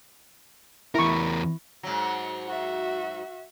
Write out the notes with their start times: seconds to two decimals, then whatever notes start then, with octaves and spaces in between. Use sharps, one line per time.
0.95 E2 E4 A#4 C#6
1.83 G#2 F#3
2.48 F#4 E5